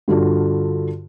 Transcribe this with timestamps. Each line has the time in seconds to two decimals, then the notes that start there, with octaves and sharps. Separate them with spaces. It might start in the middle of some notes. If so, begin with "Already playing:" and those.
0.08 G2 D3 F4 F#4